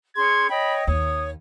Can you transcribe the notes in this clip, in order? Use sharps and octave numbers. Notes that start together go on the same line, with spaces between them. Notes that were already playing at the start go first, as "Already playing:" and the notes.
C#4 G#4 C6 G#6
C#5 D#5 G5 B5
D#2 C#5 D#6